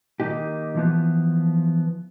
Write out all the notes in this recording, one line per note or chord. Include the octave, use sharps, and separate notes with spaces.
D#3 A#3 D#4 G4
E3 F3 B3